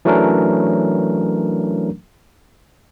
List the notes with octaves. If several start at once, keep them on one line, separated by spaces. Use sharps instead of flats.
E3 F#3 A3 C#4 D4 A#4